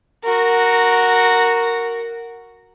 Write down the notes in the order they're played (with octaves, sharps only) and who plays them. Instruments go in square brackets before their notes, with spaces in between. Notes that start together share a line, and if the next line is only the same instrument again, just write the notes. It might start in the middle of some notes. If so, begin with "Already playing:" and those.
[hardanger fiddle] F#4 A#4